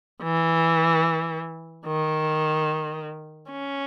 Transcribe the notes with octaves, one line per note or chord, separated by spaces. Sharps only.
E3
D#3
C#4